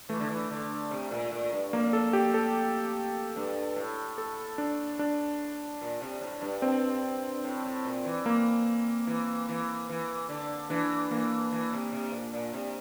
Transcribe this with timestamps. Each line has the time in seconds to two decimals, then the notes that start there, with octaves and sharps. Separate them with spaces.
0.09 E3 A3
0.20 D3
0.29 E3
0.50 D3
0.91 C3
1.11 A#2
1.31 A#2
1.53 G2
1.73 F2 A#3
1.93 A4
2.13 G4
2.34 A4
3.36 G2
3.76 A2
4.18 A4
4.58 D4
4.99 D4
5.81 A#2
6.02 C3
6.21 A2
6.31 A2
6.42 G2
6.62 C4
7.44 A2
7.65 A2
7.85 A#2
8.05 E3
8.26 A#3
9.07 E3
9.49 E3
9.89 E3
10.29 D3
10.70 E3 D4
11.11 E3 A#3
11.52 E3
11.73 C3
11.93 C3
12.13 A#2
12.33 A#2
12.53 C3